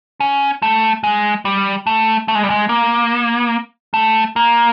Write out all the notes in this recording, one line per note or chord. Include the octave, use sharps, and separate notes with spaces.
C#4
A3
G#3
G3
A3
A3
G#3
G3
G#3
A#3
A3
A#3